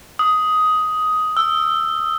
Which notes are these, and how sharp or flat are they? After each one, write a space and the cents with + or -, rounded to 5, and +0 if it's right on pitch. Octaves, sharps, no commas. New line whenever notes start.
D#6 +10
E6 +15